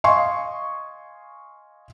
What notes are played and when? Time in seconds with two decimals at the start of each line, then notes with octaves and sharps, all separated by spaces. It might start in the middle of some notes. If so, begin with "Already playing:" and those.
0.04 D#5 F5 G#5 C6 C#6